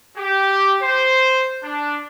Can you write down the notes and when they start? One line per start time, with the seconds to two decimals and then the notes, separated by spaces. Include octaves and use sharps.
0.17 G4
0.82 C5
1.63 D4